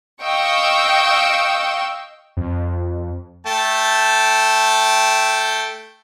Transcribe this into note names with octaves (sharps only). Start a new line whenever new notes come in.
D#5 F5 G5 C#6 E6
F2
A3 G5 A5